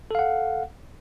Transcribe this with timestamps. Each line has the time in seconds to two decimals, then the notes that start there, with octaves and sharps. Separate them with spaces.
0.11 A4
0.15 F5
0.19 F#5